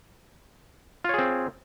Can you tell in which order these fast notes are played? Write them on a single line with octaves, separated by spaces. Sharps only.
F4 C#5 G#4 C4